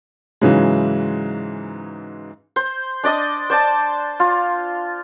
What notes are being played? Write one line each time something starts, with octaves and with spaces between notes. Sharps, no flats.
G#2 C#3 E3 F#3 G#3
C5
D4 D5 D#5 D#6
C5 D5 A5
F4